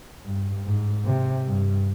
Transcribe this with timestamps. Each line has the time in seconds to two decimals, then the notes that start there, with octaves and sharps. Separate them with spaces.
0.24 G2
0.65 G#2
1.06 C3
1.46 G2